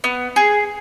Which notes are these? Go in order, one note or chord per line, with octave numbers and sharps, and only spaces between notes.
B3
G#4